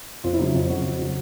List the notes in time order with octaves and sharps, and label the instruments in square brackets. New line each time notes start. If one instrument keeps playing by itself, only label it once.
[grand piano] F2 F4
E4
C#3 F#3 D#4
F2 F4
C#3 F#3 F#4
F2
C#3 F#3